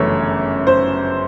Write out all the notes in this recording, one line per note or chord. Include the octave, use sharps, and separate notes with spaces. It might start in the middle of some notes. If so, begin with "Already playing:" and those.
Already playing: G1 F#2 C#3 E3 A3 C#5
C5